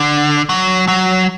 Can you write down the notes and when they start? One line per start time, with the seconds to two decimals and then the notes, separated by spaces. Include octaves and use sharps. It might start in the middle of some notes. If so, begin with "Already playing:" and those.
Already playing: D3
0.49 F#3
0.88 F#3